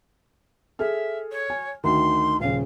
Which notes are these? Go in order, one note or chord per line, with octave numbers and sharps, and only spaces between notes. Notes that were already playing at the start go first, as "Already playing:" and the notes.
G#4 A4 E5 F6
C#5
G#5
D2 D#3 C6
D#1 C#3 F5